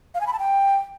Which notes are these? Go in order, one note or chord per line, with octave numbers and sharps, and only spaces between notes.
F5
G#5
B5
A5
G5